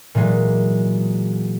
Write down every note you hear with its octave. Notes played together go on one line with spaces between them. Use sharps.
A#2 E3 F#3 G#3